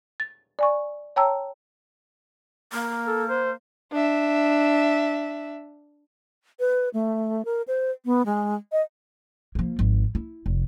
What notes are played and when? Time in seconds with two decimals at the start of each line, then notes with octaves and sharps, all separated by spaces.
0.20 A6
0.59 D5 G#5 C#6
1.16 C#5 G5 A5 A#5 E6
2.73 A#3
3.07 A4
3.29 C5
3.92 D4 E5
6.60 B4
6.94 A3
7.45 A#4
7.68 C5
8.05 B3
8.26 G#3
8.72 D#5
9.55 F3 A#3
9.79 G#1 F3
10.15 E4
10.46 F1